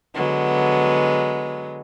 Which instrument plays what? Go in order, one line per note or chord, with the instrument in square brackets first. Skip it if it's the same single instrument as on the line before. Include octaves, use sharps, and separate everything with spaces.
[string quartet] D3 F#3 G#3 B3